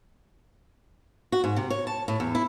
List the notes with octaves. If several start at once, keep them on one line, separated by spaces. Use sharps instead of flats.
F#4
G#2
C3
C#5
A5
A2
E2
E4